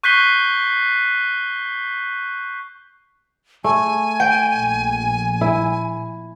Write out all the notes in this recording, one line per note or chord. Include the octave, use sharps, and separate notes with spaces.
C#6 F#6 G6 B6 C7 G7
A3 G#5
G5
A#1
E4